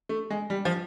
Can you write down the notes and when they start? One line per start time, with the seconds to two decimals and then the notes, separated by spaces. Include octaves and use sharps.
0.09 A3
0.30 G#3
0.50 G3
0.65 F3